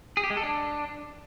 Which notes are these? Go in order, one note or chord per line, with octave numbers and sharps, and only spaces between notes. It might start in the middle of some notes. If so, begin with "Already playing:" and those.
G#4
G4
G#3
A4
D4